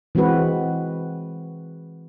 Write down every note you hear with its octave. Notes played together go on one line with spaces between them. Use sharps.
E3 G#3 C4 F#4 B4